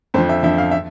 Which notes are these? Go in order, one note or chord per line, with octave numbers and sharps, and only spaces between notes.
F2 D3 F3 C5
E5
F2 D3 F3 E5
F5
E5